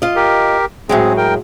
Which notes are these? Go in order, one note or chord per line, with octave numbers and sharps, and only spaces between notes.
F4 D#5
G4 A#4
A2 F#3 G#3 C4 G#4
A#4 G5